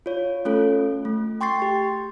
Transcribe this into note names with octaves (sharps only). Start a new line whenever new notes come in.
F4 C#5
A3 C#4 F4 A4
A3
G5 C6 C#6 A6 C7
G4